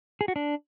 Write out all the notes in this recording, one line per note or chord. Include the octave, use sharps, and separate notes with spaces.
G#4
F#4
D4